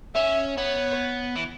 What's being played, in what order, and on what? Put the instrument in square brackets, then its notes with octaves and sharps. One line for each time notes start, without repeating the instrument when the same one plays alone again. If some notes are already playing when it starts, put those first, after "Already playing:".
[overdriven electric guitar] C#4 [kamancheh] E5
[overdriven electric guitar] B3 [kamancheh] C#5
[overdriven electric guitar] E3